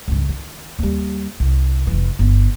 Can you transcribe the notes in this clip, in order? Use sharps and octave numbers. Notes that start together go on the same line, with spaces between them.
C#2 G2
D#3
D#2 G3
C2
F1 E3
G1 B3